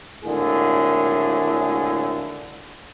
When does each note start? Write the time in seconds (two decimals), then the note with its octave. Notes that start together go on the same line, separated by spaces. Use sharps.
0.23 G#1 A2 D3 A#3 G#4